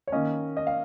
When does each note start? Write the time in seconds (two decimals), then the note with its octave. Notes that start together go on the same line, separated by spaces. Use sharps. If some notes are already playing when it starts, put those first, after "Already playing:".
0.07 C#5
0.12 D#3 A#3 C#4 D#5
0.57 D#5
0.67 F5